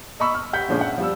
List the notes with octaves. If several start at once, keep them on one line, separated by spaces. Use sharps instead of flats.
D#5 A#5 B5 C#6 E6
F6
G4 F#5 G6 B6
A#2 D3 F3 G#3 C#4
E5 F#5
F3 G3 E6